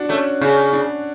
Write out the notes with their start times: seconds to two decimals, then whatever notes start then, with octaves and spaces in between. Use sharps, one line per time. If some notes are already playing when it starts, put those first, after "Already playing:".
Already playing: D4 F#4
0.09 A3 C#4
0.41 C#3 D4
0.73 D4